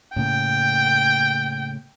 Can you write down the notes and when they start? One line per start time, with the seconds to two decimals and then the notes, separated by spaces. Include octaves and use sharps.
0.16 A2 C#3 A#3 G5